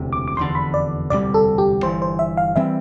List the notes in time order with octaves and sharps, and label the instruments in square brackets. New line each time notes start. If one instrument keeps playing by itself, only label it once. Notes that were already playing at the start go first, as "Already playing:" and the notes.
Already playing: [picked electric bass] E1 D2 C3
[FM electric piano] D6
D6
[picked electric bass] F1 E2 D3 [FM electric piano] C6
[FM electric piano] B5
D5
[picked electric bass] E1 D2 C3 G3 [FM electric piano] D5
[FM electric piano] A4
G4
[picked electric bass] G1 G2 E3 [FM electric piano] C5
[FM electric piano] C5
E5
F5
[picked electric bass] E3 G3 C4 [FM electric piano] E5